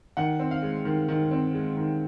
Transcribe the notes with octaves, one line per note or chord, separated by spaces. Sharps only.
D#3 F#5
C4
F5
G#3
D#3
D#3
C4
G#3
D#3